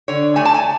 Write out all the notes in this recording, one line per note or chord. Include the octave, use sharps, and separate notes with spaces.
D3 C#5
A3 G#5
A5
G#5